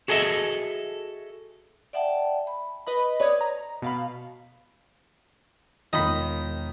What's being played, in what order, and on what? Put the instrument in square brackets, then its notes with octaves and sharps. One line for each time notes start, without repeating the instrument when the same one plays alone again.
[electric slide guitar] F#4 G#4 A4 D#5 E5
[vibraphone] D5 E5 F#5 G5 A5
B5
[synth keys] B4 D#5 B5
B4 C#5 D5 D#6 G#6
A#5
B2 F5 B5
[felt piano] E1 F4 [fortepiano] D#3 [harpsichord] D#5 B5